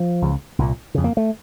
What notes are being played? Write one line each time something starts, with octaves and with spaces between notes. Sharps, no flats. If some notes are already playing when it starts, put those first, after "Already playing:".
Already playing: F3
C#2 C#3
C2 A#2
F2 C#3
A#3
A3